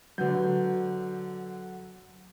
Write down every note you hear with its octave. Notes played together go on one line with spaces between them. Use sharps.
D3 F#3 B4 G6